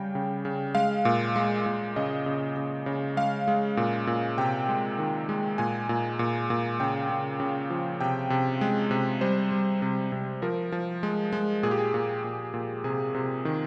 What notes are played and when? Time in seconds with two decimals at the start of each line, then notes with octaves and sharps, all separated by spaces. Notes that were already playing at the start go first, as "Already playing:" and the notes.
Already playing: C#3 G3 G5
0.15 C#3
0.45 C#3
0.75 G#3 F5
1.05 A#2
1.36 G#3
1.66 A#2
1.96 C#3 D#5
2.26 C#3
2.56 C#3
2.86 C#3
3.17 G#3 F5
3.48 G#3
3.77 A#2
4.07 A#2
4.38 C3 G5
4.69 G#3
4.99 D#3
5.29 G#3
5.58 A#2 G#5
5.89 A#2
6.19 A#2
6.50 A#2
6.80 C#3 G5
7.10 C#3
7.40 C#3
7.70 F3
8.00 C3 G5
8.30 C3
8.61 G#3
8.91 C3
9.21 G3 C5
9.52 G3
9.82 C3
10.12 C3
10.42 F3 A#4
10.72 F3
11.03 G#3
11.33 G#3
11.63 A#2 G#4
11.71 G4
11.79 G#4
11.94 A#2
12.24 A#2
12.54 A#2
12.84 C3 G#4
13.15 C3
13.45 D#3